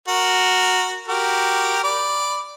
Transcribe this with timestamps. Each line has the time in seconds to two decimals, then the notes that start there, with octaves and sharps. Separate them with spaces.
0.08 F#4 A#4
1.08 F#4 G4 A#4
1.84 D5 B5